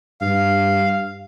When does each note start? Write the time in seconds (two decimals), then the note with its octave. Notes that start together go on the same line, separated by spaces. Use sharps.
0.21 G2 F5